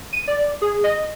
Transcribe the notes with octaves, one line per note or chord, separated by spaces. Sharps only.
D#7
D5
G#4
D#5